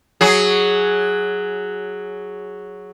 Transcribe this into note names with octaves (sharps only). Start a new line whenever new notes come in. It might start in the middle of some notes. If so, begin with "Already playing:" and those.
F#3 G#4